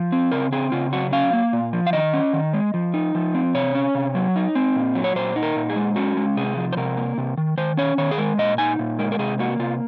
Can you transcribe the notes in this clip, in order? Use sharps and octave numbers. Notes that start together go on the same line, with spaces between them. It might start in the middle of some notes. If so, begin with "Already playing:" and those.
Already playing: F3
C4
C#3 A#4
C4 G#4
C#3 F4
F#3 F#4
C#4 F5
A#3
A#2
F3
F5
D#3 D#5
C#4
D#3
G#3
F3
D#4
F3
C4
C3 C#5
C#4
C3
F#3
D#4
C4
A#2
F#3
C#5
A#2 C5
D#4
A#4
A#2
G#4
G#3
C#4 F#4
G#3
C3 G#4
F3
C5
C3 A#4
A#3
C3
D#3
D#3 C5
C#4 C#5
D#3 C#5
G#4
G#3 A#4
A#2 D#5
D#4 G#5
A#2
G#3 A#4
A#4
C3 G#4
A#3 F#4
C3 F4